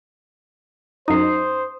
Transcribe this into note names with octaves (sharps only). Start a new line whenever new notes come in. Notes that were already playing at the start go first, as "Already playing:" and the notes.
F#2 D#4 C5 D#6 C7